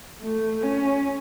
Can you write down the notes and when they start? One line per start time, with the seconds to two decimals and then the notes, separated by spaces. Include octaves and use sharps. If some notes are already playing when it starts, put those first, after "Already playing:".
0.22 A3
0.63 C#4